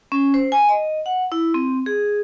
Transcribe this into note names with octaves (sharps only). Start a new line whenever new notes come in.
C#4
C5
G#5
D#5
F#5
E4
C4
G#4